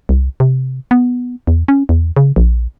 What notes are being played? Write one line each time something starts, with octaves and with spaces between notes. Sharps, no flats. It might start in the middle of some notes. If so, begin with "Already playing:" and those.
C2
C3
B3
E2
C#4
E2
C#3
A#1